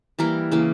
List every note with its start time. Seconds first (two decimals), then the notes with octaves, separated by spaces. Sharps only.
0.19 E3 G3 A#3 A#4
0.51 C#3 E3 A#3